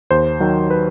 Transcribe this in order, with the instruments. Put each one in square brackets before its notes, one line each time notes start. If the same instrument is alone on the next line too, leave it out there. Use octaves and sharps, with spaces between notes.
[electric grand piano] D#2 C5
D#3 F#3
B4